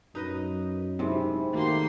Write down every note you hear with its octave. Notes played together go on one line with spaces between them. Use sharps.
F#2 D#4 B4 D#5
G#2 C3 C4 E4
D#3 A3 A#3 F#4 G4 C6